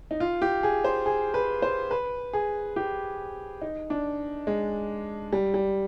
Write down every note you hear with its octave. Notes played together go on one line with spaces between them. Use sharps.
D#4
F4
G4
G#4
C5
G#4
B4
C5
B4
G#4
G4
D#4
D4
G#3
G3
G3